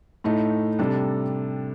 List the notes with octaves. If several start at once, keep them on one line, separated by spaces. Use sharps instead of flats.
A2 A3 D#4
C3 G3 D4 A4